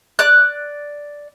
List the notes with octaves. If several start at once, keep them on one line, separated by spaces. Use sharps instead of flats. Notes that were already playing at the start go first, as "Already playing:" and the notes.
D5 F#6